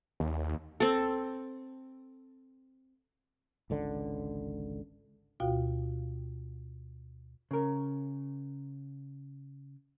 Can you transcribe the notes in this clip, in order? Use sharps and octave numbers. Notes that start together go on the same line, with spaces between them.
D#2
C4 A4
G#1 C#2 D3
D2 B2 F4 F#4 F5 G5
C#3 A#4